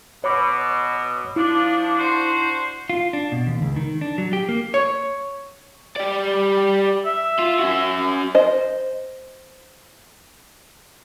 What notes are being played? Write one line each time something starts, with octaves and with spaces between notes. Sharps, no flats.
B2 C#5 B5 D6
F3 D4 E4
D4 F#4 C5
F4
D4
B2
D#2
C#2
D#3
D4
F#3
G4
A#3
C#5
G3 D5
E5
F4
C#4 F#4
C5 D#5